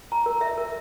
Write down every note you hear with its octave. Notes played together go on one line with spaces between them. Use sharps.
A#5
A#4
E5
A#4